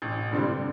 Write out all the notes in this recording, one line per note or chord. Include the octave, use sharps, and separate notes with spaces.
A1
G2 D3 G3 C4